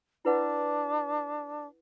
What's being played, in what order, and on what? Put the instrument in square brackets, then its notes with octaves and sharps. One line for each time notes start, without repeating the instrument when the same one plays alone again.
[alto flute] D4 [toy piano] E4 B4 F#5